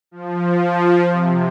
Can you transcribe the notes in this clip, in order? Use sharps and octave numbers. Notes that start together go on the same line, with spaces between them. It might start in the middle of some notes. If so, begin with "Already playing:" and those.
F3
C3